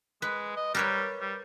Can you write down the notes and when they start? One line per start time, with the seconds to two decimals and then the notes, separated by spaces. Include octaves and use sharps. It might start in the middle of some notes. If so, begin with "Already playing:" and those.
0.22 G#3 B4
0.57 D#5
0.75 G3 A#4 B4 C#5
1.21 G3